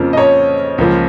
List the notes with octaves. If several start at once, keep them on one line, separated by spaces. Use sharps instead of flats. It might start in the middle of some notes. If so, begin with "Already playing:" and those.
Already playing: F2 C#3 F3 A#3
D#5
C#5
C#2 C#3 F3 A#3